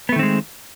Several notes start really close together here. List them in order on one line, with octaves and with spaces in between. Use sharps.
B3 A3 D#3 C4 G#3